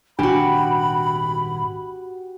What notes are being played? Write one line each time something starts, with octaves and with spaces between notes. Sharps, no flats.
D#1 G#1 C3 D4 F#4 G4 B5